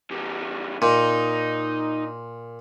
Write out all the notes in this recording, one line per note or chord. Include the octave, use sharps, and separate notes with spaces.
E2 G3
A#2 D#4